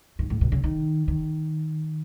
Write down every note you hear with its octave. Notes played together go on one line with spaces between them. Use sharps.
G#2
A2
B2
C#3
D#3
D#3